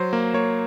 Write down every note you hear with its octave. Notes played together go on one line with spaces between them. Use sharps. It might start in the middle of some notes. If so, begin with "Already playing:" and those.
Already playing: F#3 C5
A#3
A#3 C#5